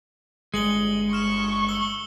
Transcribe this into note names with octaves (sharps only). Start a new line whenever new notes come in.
G1 G#3 C#7 F#7 G7
C#6 F6 E7
E6 G7